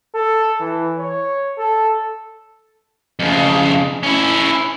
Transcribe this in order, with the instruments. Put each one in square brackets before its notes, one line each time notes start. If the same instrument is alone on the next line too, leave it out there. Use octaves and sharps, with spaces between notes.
[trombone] A4
E3
C#5
A4
[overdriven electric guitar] F2 C#3
C#4 E4